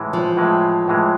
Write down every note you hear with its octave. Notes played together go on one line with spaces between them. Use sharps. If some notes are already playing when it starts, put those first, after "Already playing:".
Already playing: A2 E3 G#3
F3
A2 E3 G#3
A2 E3 G#3